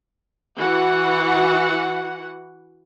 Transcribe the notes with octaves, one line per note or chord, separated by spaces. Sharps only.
E3 F#4 F#5